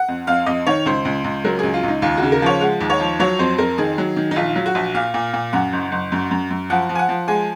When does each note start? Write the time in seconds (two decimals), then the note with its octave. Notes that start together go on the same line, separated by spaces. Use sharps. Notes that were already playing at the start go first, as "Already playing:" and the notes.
Already playing: F#5
0.08 F2
0.27 F2 F5
0.46 F2 D#5
0.67 D#3 C#5
0.86 C#2 C5
1.05 C#2
1.24 C#2
1.44 F#3 A#4
1.59 C#2 G#4
1.74 F4
1.83 C#2 D#4
2.02 D#2 F4
2.17 F#4
2.22 C#3
2.32 A#4
2.42 F3 C#5
2.61 G#3 F#5
2.81 D#2
2.90 C#5
3.00 F3
3.20 F#3 C#5
3.39 F2 C5
3.58 F2 A#4
3.78 D#3 G#4
3.98 F#3
4.16 D#3
4.31 D#4
4.36 A#1 F4
4.56 F#3
4.66 F#4
4.75 A#1
4.95 A#2 F5
5.14 A#2
5.34 A#2
5.53 F#2 F#5
5.73 F#1
5.92 F#1
6.12 F#2
6.31 F#2
6.51 F#2
6.70 F3 F#5
6.89 F3
6.95 G#5
6.99 F#5
7.09 F3
7.28 G#3 G#5